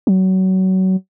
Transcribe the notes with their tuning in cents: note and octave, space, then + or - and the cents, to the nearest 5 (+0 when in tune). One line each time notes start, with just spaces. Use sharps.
F#3 +25